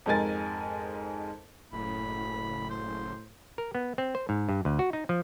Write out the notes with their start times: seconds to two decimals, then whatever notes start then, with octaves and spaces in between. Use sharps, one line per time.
0.06 F2 G#2 G#3 A#4 G#5 A6
1.73 F#1 A2 B5
2.70 C5
3.58 A#4
3.75 B3
3.98 C4
4.15 C5
4.29 G#2
4.49 G2
4.65 D2
4.79 F#4
4.93 D#4
5.09 F3